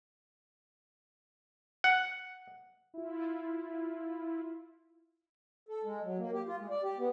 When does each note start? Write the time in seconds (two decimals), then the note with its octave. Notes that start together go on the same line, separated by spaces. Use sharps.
1.84 F#5
2.94 E4 F4
5.69 A4
5.84 G#3
6.04 F#3
6.18 A#3
6.33 G4
6.47 F4
6.58 G#3
6.71 D5
6.83 G4
6.98 B3